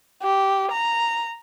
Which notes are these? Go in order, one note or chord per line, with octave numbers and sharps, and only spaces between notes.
G4
A#5